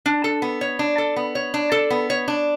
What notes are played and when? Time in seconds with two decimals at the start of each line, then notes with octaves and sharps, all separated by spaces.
0.06 D4
0.24 A4
0.42 B3
0.61 C#5
0.79 D4
0.98 A4
1.16 B3
1.35 C#5
1.54 D4
1.72 A4
1.90 B3
2.10 C#5
2.28 D4